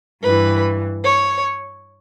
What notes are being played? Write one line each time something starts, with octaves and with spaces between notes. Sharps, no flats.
G2 E3 B4
C#5